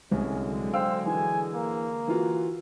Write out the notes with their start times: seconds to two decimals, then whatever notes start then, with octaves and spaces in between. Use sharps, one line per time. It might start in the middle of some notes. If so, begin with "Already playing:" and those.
0.11 C2 D3 F#3 G#3 C#4
0.73 C5 F5 G5 E6
1.06 E3 G#5
1.54 A#3
2.08 E3 F4 F#4